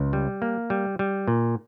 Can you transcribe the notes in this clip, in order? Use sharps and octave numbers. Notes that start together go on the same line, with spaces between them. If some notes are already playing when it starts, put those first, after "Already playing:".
Already playing: C#2
G3
A#3
G3
G3
A#2